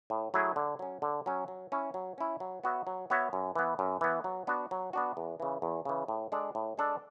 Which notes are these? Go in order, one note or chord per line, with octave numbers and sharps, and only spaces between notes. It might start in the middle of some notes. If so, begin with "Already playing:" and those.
A2
F#3 A3 E4 G#4
D3
F#3 C#4
D3
F#3 C#4
F#3
C#4 E4
F#3
C#4 E4
F#3
B3 F#4 C#5 E5
F#3
B3 F#4 C#5 E5
F#2
E3 B3
F#2
E3 B3
F#3
B3 D4 F#4
F#3
B3 D4 F#4
E2
C#3 E3
E2
C#3 E3
A2
G#3 D4 A4 D5
A2
G#3 D4 A4 D5